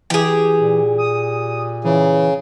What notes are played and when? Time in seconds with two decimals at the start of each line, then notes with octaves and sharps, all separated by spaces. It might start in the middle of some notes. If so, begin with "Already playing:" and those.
0.10 E3 G4 G#4
0.58 A#2
0.98 D#6
1.84 C#3 E3